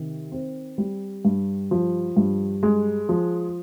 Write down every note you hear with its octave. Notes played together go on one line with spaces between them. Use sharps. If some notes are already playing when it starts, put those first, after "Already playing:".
Already playing: C3 D#3
C4
G3
G2
F3
G2
G#3
F3